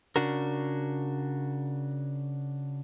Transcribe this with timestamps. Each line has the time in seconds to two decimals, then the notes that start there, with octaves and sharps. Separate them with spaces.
0.16 C#3 D4 F#4 A#4